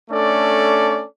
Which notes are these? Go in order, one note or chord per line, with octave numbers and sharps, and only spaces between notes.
A3 C#4 D4 A4 D5